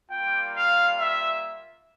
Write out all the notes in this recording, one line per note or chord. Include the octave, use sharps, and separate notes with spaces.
G3 A#3 F4 G5
F5
E5